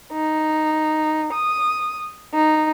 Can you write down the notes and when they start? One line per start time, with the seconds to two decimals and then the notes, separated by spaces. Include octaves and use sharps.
0.13 D#4
1.32 D#6
2.34 D#4